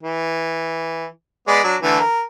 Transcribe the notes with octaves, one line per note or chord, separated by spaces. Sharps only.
E3
G#3 B3 D5
F#3 D4
D3 E3 A3
A#4